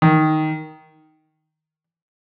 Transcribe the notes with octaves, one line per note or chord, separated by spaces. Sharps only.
D#3